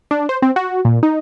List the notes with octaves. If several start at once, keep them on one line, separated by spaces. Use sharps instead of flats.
D4
C5
C4
F#4
A#2
D#4